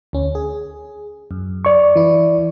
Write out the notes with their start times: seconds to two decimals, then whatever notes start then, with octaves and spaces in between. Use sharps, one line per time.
0.13 D2 C#4
0.35 G#4
1.31 F#2
1.65 D5 C#6
1.95 E3 E4